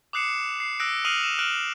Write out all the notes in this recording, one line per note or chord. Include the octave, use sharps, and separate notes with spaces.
D6 D#6 F#6 C7 C#7 E7
C7
D#6 E6 F#6 A#6 D7
D#6 F6 C7 D#7 F7 F#7
D#7 E7
D#6 F6 F#6 D7 E7 F#7